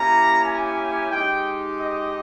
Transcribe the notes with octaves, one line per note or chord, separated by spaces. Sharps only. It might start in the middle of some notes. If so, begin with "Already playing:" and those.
Already playing: A#3 C#4 E4 G4 A#5
G#5
G#3 D#4 G4 G5
D#5